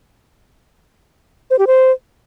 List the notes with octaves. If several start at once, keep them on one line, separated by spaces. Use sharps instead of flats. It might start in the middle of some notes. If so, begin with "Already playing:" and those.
C5
G4
C5